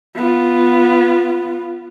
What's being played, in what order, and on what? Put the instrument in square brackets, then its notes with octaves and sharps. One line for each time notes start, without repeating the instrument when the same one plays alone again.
[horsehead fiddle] B3 F4